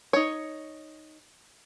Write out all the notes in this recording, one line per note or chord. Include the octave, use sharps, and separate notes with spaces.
D#4 C#5